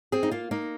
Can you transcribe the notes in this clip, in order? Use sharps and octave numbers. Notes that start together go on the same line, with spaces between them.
C4 G#4
D#4
A#3 F4
A#3 D#4